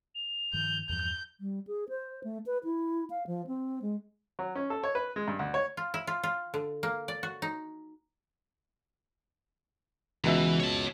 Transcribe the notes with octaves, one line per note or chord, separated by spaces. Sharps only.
F7
G2 D#3 F3 G6
E2 G2 F3 G6
G3
G#4
C5
A3
B4
E4
F5
F3
C4
G#3
F#3
C#4
A4
C#5
B4
G#3
G2
D2
C#5
F4
E4
F4
F4
D3
A#3
D5
F#4
D#4
C#2 B2 E3 E5
C#5 A5